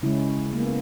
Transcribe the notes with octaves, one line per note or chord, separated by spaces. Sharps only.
C#3 G#3 C#4 E4
A#3
B3